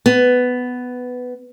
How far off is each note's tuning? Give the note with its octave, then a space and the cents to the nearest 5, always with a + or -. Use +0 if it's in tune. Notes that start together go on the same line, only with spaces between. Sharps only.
B3 +10